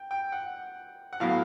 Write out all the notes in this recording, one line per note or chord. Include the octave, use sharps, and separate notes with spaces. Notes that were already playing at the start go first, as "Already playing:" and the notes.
Already playing: G5
G5
F#5
F#5
A2 F#3 B3 E4 F5